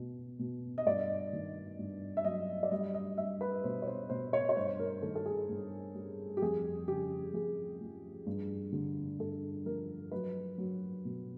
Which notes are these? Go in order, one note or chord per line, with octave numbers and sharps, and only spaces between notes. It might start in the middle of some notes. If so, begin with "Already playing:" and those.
Already playing: B2
B2
D#5
G2 D5
D#3
G2
E5
F#3 D#5
D5
G3 D#5
D#5
G3 E5
B4
B2 C5
C#5
C5
B2 C5
C#5
C#5
G2 C5
A#4
D#3 A4
A4
G#4
G2
G3
G4
F2 G#4
C#3 G4
F2 G#4
F3
G2
D3
G2 A4
F3 A#4
F#3 B4
F#3
B2